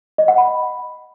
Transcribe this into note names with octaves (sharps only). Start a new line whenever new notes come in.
D#5
F#5
B5